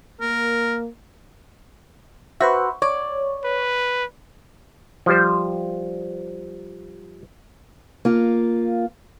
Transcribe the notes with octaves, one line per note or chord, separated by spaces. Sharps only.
A#3 A#4
F#4 B4 C5 E5
C#5 D5
B4
F3 G3 C5
A#3 F4